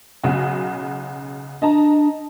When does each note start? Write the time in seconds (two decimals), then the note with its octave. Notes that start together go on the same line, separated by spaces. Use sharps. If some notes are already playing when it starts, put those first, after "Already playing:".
0.23 B1 C#3 F#4
1.62 D4 D#5 A5 A#5